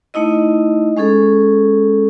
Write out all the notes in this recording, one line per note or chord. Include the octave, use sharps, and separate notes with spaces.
A3 D#4 E4 D#5
G#3 C#4 G#4 A4